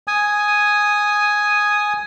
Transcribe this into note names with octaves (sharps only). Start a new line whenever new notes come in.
G#5 D#6